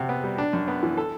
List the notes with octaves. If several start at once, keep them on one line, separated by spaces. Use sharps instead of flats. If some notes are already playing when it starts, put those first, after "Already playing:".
Already playing: C3 F#4
B3
G3
D4
F#2
B3
E3
A4